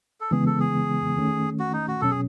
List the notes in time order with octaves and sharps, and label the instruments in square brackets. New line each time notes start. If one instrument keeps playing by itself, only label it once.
[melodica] A4
[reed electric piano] C#3 E3 G#3 B3 [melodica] G#4
[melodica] A4
G#4
[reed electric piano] D#3 A3 C#4
[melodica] F#4
D#4
F#4
[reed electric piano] B2 F#3 C#4 [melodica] A4
[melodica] G#4